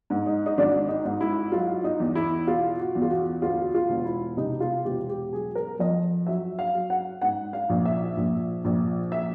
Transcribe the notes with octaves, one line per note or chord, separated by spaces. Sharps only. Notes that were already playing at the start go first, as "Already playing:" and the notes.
G#2
D#4
D#4
G#1 D4
D#4
G#2
E4
F#3 F4
D#4
E2
E4
B2 F4
F#4
E2
F4
F#4
D2 F4
F4
E1
E4
C3 D#4
F4
E1 G4
G4
F#3 G#4
A#4
F2 D#5
F#3 E5
F5
F#3
F#5
G#2 F#5
F5
A#1
E5
A#1
A#1
E5